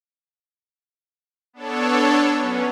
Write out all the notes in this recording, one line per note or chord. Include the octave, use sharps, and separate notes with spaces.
B3 D4 A4 C#5
F#3 B3 C#4